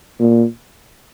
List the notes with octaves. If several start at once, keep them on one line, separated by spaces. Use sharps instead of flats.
A#2